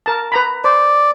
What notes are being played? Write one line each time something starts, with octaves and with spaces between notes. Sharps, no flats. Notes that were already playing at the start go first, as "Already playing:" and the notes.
A#4 A5
B4 A#5 B5
C5 D5